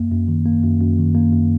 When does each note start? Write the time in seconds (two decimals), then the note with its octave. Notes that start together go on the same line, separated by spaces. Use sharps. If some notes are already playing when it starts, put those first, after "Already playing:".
Already playing: F#2 A#3
0.11 F#2
0.28 D#3
0.46 A#3
0.64 F#2
0.81 F#2
0.98 D#3
1.15 A#3
1.33 F#2